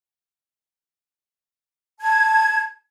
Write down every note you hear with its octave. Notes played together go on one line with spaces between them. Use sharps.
A5 G#6